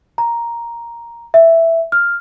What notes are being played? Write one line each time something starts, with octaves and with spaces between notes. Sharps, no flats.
A#5
E5
F6